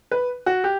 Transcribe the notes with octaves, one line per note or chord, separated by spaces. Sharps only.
B4
F#4
G4